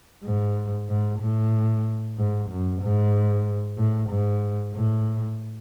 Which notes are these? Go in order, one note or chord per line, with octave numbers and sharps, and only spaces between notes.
G#2
G#2
A2
G#2
F#2
G#2
A2
G#2
A2